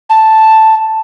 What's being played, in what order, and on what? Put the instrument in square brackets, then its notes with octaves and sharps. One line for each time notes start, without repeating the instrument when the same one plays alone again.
[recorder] A5